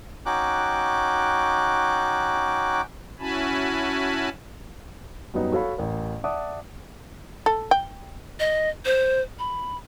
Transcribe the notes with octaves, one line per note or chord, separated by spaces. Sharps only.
C#4 D#4 F#4 G5 D6 F#6
C#4 E4 F#4 G#5 A5 B5
F#2 F#3 G3 B3 D#4
F#4 A4 C#5 F5 B5
A1 A#4
D5 E5 F#5 A5 D6 D#6
A4
G5
D#5
C5
B5